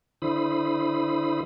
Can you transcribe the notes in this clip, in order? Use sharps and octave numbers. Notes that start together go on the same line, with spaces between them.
D3 E4 C5 B5 D#6